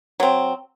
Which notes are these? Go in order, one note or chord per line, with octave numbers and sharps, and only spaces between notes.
F#3 C4